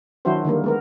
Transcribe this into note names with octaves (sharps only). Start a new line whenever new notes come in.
D#3 F#3 D4 E4 F#4 C5
D3 D#3 G3 A#3
G#3 B3 A#4